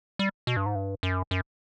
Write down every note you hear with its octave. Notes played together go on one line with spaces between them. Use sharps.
G3
B2
G2
G#2
G2
F#2
F#2